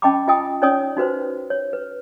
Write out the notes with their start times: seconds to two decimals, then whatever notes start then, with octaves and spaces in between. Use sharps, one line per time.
0.02 C#4 D#5 G5 A5 B5 D6
0.28 F4 D#5 G5 G#5 D#6
0.62 C#4 D#4 C#5 D5 G#5 D#6
0.96 D#4 F#4 B4 C5
1.50 C#5
1.73 B4